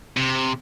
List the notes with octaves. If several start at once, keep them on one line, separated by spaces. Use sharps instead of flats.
C3